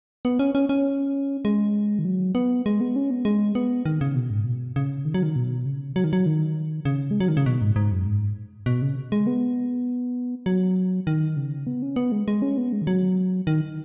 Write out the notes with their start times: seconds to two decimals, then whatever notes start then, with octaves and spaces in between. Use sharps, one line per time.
0.25 B3
0.39 C#4
0.55 C#4
0.69 C#4
1.45 G#3
1.99 D#3
2.05 F#3
2.35 B3
2.66 G#3
2.81 B3
2.96 C#4
3.11 B3
3.25 G#3
3.55 B3
3.85 D#3
4.01 C#3
4.15 B2
4.30 G#2
4.45 B2
4.76 C#3
5.05 D#3
5.14 F#3
5.23 D#3
5.36 B2
5.65 C#3
5.96 F#3
6.04 D#3
6.13 F#3
6.26 D#3
6.85 C#3
7.11 G#3
7.20 F#3
7.28 D#3
7.37 C#3
7.46 B2
7.62 G#2
7.76 G#2
7.92 F#2
8.06 G#2
8.66 B2
8.82 C#3
9.12 G#3
9.27 B3
10.46 F#3
11.07 D#3
11.37 C#3
11.67 B3
11.82 C#4
11.96 B3
12.12 G#3
12.28 G#3
12.42 C#4
12.58 B3
12.72 G#3
12.82 D#3
12.87 F#3
13.47 D#3